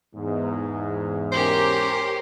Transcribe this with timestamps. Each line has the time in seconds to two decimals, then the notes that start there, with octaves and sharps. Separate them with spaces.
0.15 E2 G#2
1.32 C#4 G4 A#4 C5